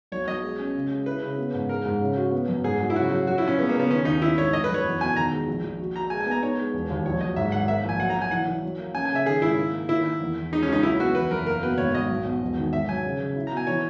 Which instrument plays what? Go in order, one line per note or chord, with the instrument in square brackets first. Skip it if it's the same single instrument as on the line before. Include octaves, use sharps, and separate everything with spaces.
[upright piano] B1 [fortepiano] C#5
[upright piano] B1 [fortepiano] D#5
[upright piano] G#3
C#4
C#3
G#3
[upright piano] E4 [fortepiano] B4
[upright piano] C#3
B3
G#2
[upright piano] G#3 [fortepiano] A#4
[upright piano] G#2
C#3
F#4
B3
F#2
[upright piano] G#2 [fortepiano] G#4
[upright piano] F#3
[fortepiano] E4
[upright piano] C#3 [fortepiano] F#4
[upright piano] F#3
[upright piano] F#3 [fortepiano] F#4
[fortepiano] E4
[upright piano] A#2
[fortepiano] C#4
[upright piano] G#3 [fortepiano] B3
[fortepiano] A#3
[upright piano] C#3
[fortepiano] B3
[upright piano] D#3 [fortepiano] C#4
[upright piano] D#2 [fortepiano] D#4
[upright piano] D#3 [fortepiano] E4
[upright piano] G#1 [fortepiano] C#5
[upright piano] G#1 [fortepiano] D#5
[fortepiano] B4
[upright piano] F#2
[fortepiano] C#5
[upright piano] E2
[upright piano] B2 [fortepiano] G#5
[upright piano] D#3 [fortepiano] A#5
[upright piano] G#3
A#1
A#1
F#4
[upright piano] F#4 [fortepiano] A#5
[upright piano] G#3 [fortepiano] G#5
[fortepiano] G#5
[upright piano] B3 [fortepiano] A#5
[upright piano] D#4 [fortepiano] C#5
[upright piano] G#3
E1
D#2
[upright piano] A#1 [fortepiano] C#5
[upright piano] F#3 [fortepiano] D#5
[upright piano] G#2 [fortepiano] E5
[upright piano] G#1 [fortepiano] F#5
[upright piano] A#3 [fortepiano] E5
[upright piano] A#1 [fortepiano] G#5
[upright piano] F#3 [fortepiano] F#5
[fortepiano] A#5
[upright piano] F#3
[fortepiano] G#5
[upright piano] E3 [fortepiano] F#5
[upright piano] E3
F#3
A#3
[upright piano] C#4 [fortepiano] G#5
[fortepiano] G#5
[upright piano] C#3
[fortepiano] E5
[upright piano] D#3 [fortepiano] G#4
[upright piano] G#1 [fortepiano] E4
[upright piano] A#3
A#3
[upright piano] D#3 [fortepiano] E4
[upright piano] A#3
E2
E2
[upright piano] G#3 [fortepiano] D#4
[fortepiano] C#4
[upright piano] C#2 [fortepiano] D#4
[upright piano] F#3 [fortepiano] E4
[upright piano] B3 [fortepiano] F#4
[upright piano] E2 [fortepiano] B4
[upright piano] F#1 [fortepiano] A#4
[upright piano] A#3 [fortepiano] A#4
[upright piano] B2 [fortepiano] B4
[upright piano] G#1 [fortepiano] C#5
[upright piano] G#1 [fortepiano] D#5
[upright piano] B1
B2
E1
D#3
[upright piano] G#1 [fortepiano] E5
[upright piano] F#3 [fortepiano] G#5
[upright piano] C#3
C#3
E4
[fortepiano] A#5
[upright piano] B2
[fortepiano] G#5
[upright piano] E3 [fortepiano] C#5